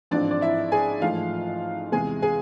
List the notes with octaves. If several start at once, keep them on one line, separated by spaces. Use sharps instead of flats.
A1 G#2 F3 G#3 C4 D4 D5
D5
E4 E5
G#4 G#5
A1 G#2 F3 A3 F4 F5
E2 C3 G#3 G#4 G#5
G#4 G#5